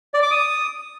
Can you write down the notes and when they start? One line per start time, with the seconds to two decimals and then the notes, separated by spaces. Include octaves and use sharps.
0.14 D5
0.22 D6
0.31 D#6